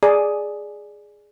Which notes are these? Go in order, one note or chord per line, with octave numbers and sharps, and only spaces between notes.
G#4 D5